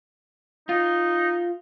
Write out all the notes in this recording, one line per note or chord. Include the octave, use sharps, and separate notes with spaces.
D#4 F4